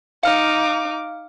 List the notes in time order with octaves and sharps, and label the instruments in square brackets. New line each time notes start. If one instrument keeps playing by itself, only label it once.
[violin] D#4 D6 [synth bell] F5 F6